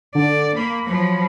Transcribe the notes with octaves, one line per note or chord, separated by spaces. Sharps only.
D3 D5
A#3 B5
F3 F#3